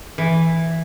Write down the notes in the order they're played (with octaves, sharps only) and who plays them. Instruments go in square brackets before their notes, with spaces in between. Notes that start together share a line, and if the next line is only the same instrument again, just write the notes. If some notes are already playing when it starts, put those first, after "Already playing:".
[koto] E3